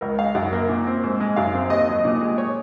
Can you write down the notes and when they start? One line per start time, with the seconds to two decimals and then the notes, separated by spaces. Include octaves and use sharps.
0.01 C#2 A#4
0.18 G#3 F5
0.35 F#2 F#5
0.53 A#3
0.69 A#2
0.87 C4
1.03 G#2
1.20 G#3
1.36 F#2 F5
1.54 C4
1.70 D#2 D#5
1.88 F#3
2.05 A#2
2.22 G#3
2.38 C#5